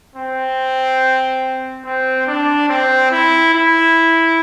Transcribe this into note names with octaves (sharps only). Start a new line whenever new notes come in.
C4
C4
D4
C4
E4
E4